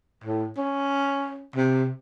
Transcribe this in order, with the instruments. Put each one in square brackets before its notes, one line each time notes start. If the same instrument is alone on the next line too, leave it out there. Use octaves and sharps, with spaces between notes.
[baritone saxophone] A2
C#4
C3